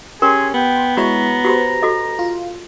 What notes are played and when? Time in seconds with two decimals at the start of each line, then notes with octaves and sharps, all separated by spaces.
0.22 C#4 G4 G#4 A#4 C6
0.54 B3 G5
0.97 G#3 E4 F#4 C#5 A#5
1.45 F#4 G4 B4 C5 B5
1.82 F#4 A4 D#5
2.19 F4